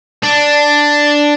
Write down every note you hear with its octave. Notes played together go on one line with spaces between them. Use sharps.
D4